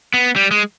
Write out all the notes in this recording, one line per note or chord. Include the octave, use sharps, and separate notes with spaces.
B3
G3
G#3